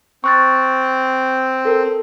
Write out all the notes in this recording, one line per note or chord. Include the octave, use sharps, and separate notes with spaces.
C4 C#6 F#6 A6
A4 A#4